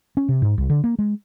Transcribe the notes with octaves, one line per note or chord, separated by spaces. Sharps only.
C#4
C3
G#2
C2
D3
A#3
G#3